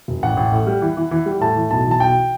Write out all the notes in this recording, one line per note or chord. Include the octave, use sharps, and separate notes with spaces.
F#1
A1 F#5
A1
A2
G3
E3
E3
E3
G3
A2 A5
E3
B1 A5
E3
A5
B1 G5